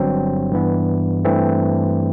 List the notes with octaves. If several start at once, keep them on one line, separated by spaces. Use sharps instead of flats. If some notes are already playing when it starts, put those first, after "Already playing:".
Already playing: G1 G2 F#3 C4
G2 E3 B3
G2 E3 A3 C4